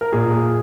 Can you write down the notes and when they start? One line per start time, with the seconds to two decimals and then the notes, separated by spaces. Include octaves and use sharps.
0.01 A#4
0.13 A#2 G#4